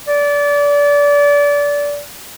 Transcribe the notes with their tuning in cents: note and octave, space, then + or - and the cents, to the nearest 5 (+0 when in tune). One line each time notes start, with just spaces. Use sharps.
D5 -25